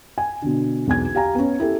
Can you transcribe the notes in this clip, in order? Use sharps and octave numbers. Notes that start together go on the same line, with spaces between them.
G#5
B2 D3
B1 E2 G#5 G#6
G4 F5 G#5 A#5
B3 C#4
E4 G4 A4